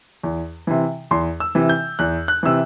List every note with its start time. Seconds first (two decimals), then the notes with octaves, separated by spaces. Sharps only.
0.23 E2
0.67 C3 E3
1.11 E2 C6
1.40 E6
1.55 C3 E3
1.69 G6
1.99 E2 F#6
2.28 F#6
2.43 C3 E3 E6